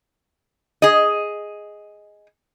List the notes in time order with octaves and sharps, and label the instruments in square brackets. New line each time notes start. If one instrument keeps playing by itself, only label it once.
[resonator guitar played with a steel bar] G#4 D#5